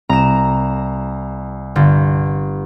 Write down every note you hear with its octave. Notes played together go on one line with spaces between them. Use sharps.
C2 A#5 E7
G1